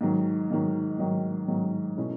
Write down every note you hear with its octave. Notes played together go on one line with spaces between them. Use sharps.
G#2 D#3 F#3
G#2 D#3 F#3
G#2 D#3 F#3
G#2 D#3 F#3
B2 A3 C#4 E4